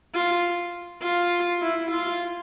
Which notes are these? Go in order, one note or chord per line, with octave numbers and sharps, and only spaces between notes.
F4
F4
E4
F4